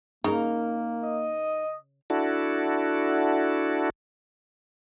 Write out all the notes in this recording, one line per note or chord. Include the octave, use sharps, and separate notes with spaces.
C#3 A#3 D#4 A#4
D#5
D4 E4 F#4 A4